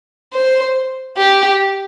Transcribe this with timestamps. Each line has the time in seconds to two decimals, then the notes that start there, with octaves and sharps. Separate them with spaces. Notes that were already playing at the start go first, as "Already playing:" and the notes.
0.33 C5
1.17 G4